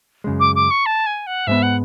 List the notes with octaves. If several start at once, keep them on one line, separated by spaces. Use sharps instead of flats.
F#2 C#3 G#3
D6
D6
C#6
A5
G#5
F#5
G#2 G#3 B3 E5
F#5